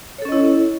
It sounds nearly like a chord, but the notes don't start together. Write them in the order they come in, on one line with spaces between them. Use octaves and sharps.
C#5 A4 C#4 D#5 E4